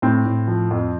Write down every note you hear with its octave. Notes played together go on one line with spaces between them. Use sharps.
A2 C4
A2
F3
F2